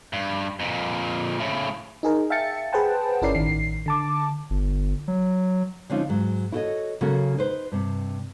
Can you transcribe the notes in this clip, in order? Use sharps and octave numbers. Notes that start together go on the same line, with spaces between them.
G2
F2 A#2
A2 C#3
D#4 G#4 A#4
E5 F5 G5 A5 A6 C#7
G#4 B4 C5 F#5 G5 A5
G1 C#4 E4 A#4 D5 C7
A1 D#3 C7
D3 A5 D6
G1
F#3
D3 F3 C4 C#4 D#4 F4
G#2 F#3
E4 F#4 A4 C5 C#5 D#5
C#3 F#3 A#3 C#4 F#4 A4
D#4 B4 C5
G2 C3